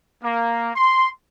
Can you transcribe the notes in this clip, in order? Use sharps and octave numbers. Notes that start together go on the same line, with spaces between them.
A#3
C6